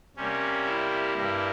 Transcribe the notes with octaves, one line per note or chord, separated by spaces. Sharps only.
C3 G3 A#3 C#4
E4
G2 G3 A#3